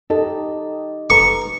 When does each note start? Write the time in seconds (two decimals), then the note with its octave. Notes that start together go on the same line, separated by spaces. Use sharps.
0.10 D#4 G4 A4 D#5
1.10 A4 B4 A#5 C#6